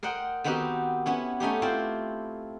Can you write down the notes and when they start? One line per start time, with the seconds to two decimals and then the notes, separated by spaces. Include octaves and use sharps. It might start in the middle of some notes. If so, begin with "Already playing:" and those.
0.03 A#4 C5 D#5 F#5 G5
0.44 D#3 B3 C4 D#4 F#4 G4
1.06 B3 C#4 E4
1.40 A3 C#4 D#4 G4
1.62 C4 E4 F4 C5 G5